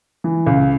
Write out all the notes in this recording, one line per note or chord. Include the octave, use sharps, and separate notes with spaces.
E3
C#2